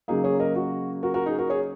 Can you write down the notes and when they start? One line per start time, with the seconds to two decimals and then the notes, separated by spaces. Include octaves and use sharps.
0.08 C#3 F#3 A#3 D#4 G#4
0.24 G#4 C#5
0.40 A#4 D#5
0.56 F#4
1.03 F#4 A#4
1.14 F#4 A#4
1.26 D#4 G#4
1.38 F#4 A#4
1.50 G#4 C#5